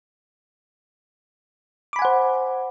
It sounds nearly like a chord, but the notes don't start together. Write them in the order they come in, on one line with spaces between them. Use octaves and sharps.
D6 B5 G#5 F#5 C5